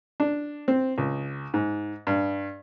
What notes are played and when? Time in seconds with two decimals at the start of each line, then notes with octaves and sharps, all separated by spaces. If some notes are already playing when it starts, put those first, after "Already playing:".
0.20 D4
0.68 C4
0.98 C#2
1.54 G#2
2.07 G2